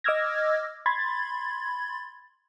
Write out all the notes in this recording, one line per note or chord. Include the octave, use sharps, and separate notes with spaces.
D#5 D6 E6 F6 G#6 A#6
B5 C6 G#6 A6